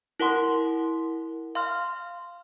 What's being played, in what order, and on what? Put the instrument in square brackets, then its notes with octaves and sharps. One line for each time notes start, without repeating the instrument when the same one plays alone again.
[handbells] E4 A#4 F#5 C6
F5 C6 F6